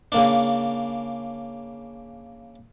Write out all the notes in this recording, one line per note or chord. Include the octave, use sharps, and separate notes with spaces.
C#3 A#3 D4